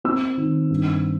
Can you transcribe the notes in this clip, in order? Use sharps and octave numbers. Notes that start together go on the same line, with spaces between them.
C4 E6
D#3
G2